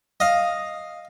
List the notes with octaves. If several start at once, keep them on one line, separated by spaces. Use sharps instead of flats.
D#5 F5